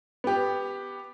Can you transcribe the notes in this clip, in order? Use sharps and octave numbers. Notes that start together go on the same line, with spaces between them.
B3 G4